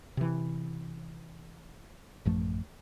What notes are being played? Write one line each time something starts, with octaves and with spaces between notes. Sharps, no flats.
C3 E3
A1 F#2 F3 A3